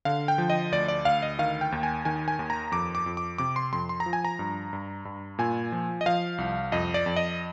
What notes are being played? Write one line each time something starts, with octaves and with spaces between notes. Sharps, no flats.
D3 F5
G5
F3
D#5
D2 D5
D5
D2 F5
D#5
D#3 F5
G5
D#2
G#5
D#3 G#5
G#5
D#2
A#5
F2 D6
D6
F2
D6
C3 D6
C6
F2 C6
C6
A#5
F3
G#5
A#5
G2
G2
G2
A#2 G#5
F3
D#5
F3 F5
C2
F2 D#5
D5
F2
D#5